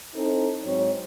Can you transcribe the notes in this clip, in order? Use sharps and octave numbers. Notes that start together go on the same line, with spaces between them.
C4 D#4 E4 A4 C5
G#2 F#3 C4 C#5